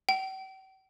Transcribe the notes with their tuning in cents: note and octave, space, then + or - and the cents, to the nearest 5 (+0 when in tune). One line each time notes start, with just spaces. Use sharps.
G5 -45